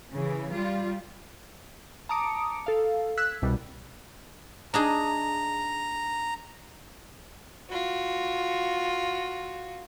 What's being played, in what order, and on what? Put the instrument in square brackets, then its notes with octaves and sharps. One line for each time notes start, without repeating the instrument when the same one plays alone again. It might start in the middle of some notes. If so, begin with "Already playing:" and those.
[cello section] C#3 E3
G3 F4
[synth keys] A5 A#5 D6 D#6 C#7 D7
A4 F5
E6 F#6 G#6 B6
C2 B2 G3
[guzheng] D4 D#4 G#4 [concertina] A#5
[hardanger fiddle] F4 F#4